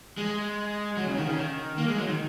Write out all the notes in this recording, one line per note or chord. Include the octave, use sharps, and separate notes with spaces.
G#3
F#3
C#3
D#3
C#3
D#3
A#3
G#3
F#3
D#3